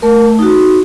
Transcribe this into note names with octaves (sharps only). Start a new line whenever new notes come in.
A3 A#4
D#4 F#4